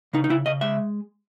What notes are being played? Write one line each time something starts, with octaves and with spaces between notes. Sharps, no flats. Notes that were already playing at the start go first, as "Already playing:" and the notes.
C#3 D#4
D#4
C#3 E4
C#3 D#5
G#3 E5